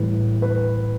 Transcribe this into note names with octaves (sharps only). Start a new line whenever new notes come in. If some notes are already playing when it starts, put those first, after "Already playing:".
Already playing: A2 E3 G3 B4
B4